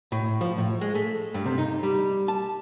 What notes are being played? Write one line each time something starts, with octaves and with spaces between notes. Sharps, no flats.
A2
F3
A2
G#3
A3
G2
C3
D#4
G3
A5